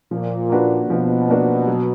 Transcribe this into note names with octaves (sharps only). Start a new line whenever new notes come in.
A#2 F3
A#3 D4 F#4 B4
B2 F3
A#3 D4 F#4 B4
F#3